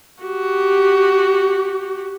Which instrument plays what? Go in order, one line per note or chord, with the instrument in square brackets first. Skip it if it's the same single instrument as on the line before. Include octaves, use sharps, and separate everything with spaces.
[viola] F#4 G4